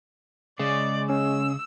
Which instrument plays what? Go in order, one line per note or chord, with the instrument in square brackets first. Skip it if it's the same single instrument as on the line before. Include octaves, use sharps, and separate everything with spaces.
[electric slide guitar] C#3 [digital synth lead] G#3 [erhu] D5
[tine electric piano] C#4 [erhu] E6